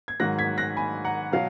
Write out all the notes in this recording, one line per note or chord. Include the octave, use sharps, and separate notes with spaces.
G#6
G#2 D#3 F#3 F#6 A#6
G#6 B6
F#6 A#6
G#5 B5
F#5 A#5
B2 F#3 F5